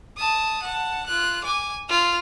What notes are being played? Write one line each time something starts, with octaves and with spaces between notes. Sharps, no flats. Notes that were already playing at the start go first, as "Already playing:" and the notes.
A5 D#6
F#5 A5
F4 F#6
G#5 D6
F4 F7